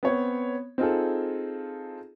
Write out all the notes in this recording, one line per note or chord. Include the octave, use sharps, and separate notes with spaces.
B3 C4 C#5
C4 D#4 F4 G#4 A4